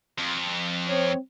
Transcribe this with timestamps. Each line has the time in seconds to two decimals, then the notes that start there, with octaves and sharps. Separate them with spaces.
0.18 F2
0.88 C4 C#5